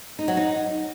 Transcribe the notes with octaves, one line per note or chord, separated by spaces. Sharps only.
D#4
F#3
D#4